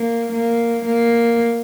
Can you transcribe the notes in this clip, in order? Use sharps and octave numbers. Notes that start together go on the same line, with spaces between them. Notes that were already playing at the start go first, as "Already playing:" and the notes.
Already playing: A#3
A#3
A#3